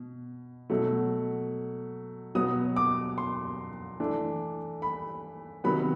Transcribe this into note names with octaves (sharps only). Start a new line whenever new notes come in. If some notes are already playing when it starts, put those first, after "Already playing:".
Already playing: B2
B2 F#3 A3
B2 F#3 B3 D#6
D6
C6
E3 A3 D4
B5
C3 D#3 F#3 B3 B5